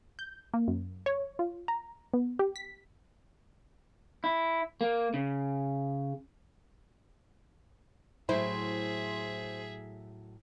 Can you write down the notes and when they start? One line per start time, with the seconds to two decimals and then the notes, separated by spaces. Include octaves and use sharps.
0.19 G6
0.54 A#3
0.68 F#2
1.06 C#5
1.39 F4
1.68 A#5
2.14 B3
2.39 G4
2.56 B6
4.24 E4
4.81 A#3
5.14 C#3
8.29 A2 F#3 E4 G#4 C5 E5